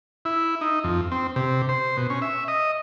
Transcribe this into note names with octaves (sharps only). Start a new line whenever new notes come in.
E4
D#4
F2
C4
C3
C5
B2
C#4
E5
D#5